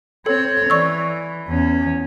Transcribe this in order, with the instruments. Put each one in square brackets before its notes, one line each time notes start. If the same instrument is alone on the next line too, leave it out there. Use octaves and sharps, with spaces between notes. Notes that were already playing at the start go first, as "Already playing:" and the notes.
[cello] C4 C#5 [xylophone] A4
[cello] E3 [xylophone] D5 C#6 E6
[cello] E2 C#4